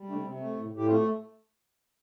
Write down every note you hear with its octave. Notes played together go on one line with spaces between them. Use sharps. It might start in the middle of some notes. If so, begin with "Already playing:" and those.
Already playing: G3
C3 A3 D4
C3 C4
A3
A2
A2
G4
A3 C4 F4